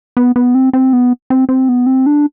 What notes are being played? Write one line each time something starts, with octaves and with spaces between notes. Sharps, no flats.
B3
B3
C4
C4
B3
C4
C4
B3
C4
D4